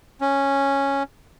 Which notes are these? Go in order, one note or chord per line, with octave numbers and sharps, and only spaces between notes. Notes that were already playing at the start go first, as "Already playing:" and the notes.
C#4